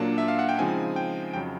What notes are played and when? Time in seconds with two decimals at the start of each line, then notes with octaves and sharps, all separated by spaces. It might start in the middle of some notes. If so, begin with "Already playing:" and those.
Already playing: A#2 F#3 A#3 D4 A5
0.18 E5
0.28 F5
0.39 F#5
0.49 G5
0.59 C#3 F3 G#3 C4 D#4 G#5
0.96 G5
1.34 F2 C#3 F#3 G5